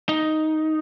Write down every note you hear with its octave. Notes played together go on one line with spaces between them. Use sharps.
D#4